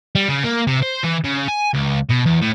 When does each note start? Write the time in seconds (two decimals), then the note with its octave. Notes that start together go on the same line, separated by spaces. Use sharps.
0.15 G3
0.28 C#3
0.43 A#3
0.67 C3
0.82 C5
1.03 E3
1.24 C#3
1.48 G#5
1.74 C#2
2.09 B2
2.25 E2
2.41 A2